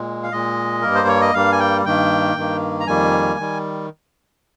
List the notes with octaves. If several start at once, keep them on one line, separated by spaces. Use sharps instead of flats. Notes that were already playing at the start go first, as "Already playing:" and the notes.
Already playing: A#2 G#3
F5
A#2 G#3 D#5
G2 G3 A#3 A#4
C5
C#5
D#5
G2 G3 A#3 F5
G#5
G5
G2 D#3 A#3 G5
G2 D#3 A#3
A#5
F2 D#3 G3 A#3 G#5
D#3 G3